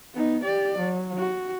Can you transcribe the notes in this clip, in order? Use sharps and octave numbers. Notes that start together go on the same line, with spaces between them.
B3 D#4
G4 D5
F#3
F#4